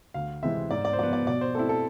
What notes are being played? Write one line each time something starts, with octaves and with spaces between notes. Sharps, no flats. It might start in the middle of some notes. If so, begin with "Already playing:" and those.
D2 F5
C3 E3 G#3 C4 E5
G#2 D5
D5
C5
F3 B3 D5
D5
B2 D5
C5
A3 C4 E4 A4
A4